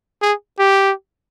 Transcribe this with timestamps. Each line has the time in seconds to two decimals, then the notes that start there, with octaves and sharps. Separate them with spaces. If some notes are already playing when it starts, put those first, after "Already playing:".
0.22 G#4
0.59 G4